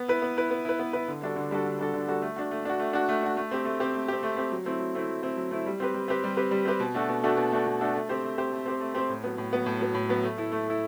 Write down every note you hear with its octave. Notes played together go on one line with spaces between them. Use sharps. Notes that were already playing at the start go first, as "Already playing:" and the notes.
Already playing: B3
E4 B4
B3
E4 B4
B3
E4 B4
B3
E4 B4
D3
G3 D4 F#4 A4
D3
G3 D4 F#4 A4
D3
G3 D4 F#4 A4
D3
G3 D4 F#4 A4
A3
D4 F#4
A3
D4 F#4
A3
D4 F#4
A3
D4 F#4
A3
C4 G4
A3
C4 G4
A3
C4 G4
A3
C4 G4
F#3
A3 C4 E4
F#3
A3 C4 E4
F#3
A3 C4 E4
F#3
A3 C4 E4
G3
C4 G4 B4
G3
C4 G4 B4
G3
C4 G4 B4
G3
C4 G4 B4
B2
A3 D4 F#4 A4
B2
A3 D4 F#4 A4
B2
A3 D4 F#4 A4
B2
A3 D4 F#4 A4
A3
C4 G4 C5
A3
C4 G4 C5
A3
C4 G4 C5
A3
C4 G4 C5
A2
F#3 B3
A2
F#3 B3
A2
F#3 B3
A2
F#3 B3
A3
E4 A4
A3
E4 A4